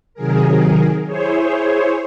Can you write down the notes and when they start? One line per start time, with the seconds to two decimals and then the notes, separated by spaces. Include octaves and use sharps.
0.14 C3 D#3 F#3 G#4 A#4
1.06 E4 G#4 C5 C#5